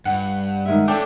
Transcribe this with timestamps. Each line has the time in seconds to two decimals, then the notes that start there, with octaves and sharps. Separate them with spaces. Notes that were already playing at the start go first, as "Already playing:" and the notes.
0.05 G2 F#5
0.65 D#3 G#3 E5
0.88 A3 C#4 D4 A4 G5 D6